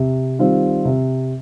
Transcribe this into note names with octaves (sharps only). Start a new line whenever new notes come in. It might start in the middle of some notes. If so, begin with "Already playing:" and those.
Already playing: C3
D#3 G3 C4 F4
C3